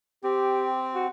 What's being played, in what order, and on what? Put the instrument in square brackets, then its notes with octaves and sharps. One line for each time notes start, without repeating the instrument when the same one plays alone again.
[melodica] C4 [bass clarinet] G4
[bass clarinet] F#4